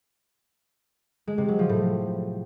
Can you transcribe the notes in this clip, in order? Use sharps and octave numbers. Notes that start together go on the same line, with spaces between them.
G#3
C3
F#3
F3
A2